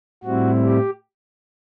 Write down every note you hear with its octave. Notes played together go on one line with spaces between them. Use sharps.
A2 G3 C4 E4 F#4
G4